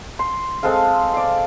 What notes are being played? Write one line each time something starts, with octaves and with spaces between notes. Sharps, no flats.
C6
G#3 C4 A4 F5
D5 F5